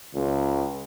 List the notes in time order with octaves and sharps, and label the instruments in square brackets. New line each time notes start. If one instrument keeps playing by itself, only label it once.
[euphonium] C#2